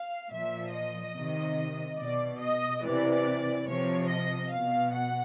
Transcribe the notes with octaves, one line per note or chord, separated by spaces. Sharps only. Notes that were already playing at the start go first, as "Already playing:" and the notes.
Already playing: F5
A#2 F3 E5
D#5
C3 D#3
B2 D5
D#5
C3 E3 D5
C3 F3 C#5
D#5
B2 F5
F#5